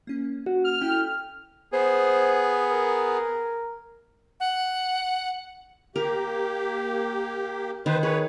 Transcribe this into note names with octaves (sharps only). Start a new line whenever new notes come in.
A#3 C#4
F#4
F6
C#4 E4 A4 G5
B3 G#4 C5
A#4
F#5
A#3 G4 A#4
D#3 B4 C5
G#4 B4 C#5